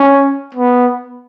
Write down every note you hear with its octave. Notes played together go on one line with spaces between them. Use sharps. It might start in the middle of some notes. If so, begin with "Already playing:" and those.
Already playing: C#4
B3